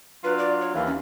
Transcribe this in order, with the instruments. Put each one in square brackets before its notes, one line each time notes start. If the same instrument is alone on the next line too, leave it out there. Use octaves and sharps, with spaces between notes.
[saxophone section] F#3 D4 F4 [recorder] B4
[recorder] D5
C#5
[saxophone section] D#2 D#3 E3 [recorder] F5
[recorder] C#4